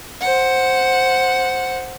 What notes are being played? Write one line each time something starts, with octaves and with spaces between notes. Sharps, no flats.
C5 F#5